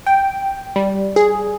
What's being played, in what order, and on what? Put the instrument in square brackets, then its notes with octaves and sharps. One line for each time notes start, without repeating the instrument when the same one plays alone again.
[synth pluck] G5
G3
G#4